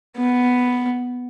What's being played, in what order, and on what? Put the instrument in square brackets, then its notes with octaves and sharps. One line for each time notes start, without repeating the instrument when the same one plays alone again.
[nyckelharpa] B3